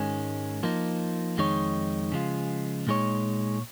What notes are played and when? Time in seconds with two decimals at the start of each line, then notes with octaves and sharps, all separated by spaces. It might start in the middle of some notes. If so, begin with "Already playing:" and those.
Already playing: G#2 D#3 G#3 C#4
0.63 F3 A#3 D#4
1.38 F2 D#3 G#3 D#4 C#5
2.12 C#3 F3 G#3 F4
2.87 A#2 G#3 D#4 C#5